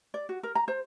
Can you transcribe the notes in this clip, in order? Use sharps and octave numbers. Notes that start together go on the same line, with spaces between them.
D5
F#4
A#4
A#5
C5